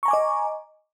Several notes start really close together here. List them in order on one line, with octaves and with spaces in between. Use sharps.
C#6 A#5 G#5 D6 D#5